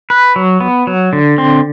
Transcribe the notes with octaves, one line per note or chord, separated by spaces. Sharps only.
B4
F#3
B3
F#3
D3
C4